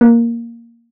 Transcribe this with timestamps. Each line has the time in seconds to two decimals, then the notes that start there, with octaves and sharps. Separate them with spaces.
0.01 A#3